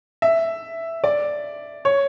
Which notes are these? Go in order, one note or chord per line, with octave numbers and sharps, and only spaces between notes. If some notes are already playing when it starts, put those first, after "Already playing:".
E5
D5
C#5